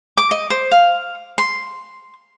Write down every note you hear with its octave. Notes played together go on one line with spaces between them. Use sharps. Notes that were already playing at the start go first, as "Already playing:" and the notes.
D6
D#5
C5
F5
C6